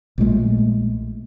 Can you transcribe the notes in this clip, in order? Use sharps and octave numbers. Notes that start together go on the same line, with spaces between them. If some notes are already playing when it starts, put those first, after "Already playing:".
A#1 A#2 G#3 A3